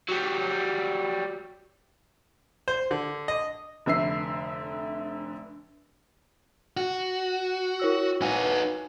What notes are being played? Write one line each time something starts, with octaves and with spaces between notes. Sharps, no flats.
F#3 G3
C5
D3
D#5
F1 D3 E5 E6 C7
F#4
E4 C#5 E6
D#4 F#4 B4 G#5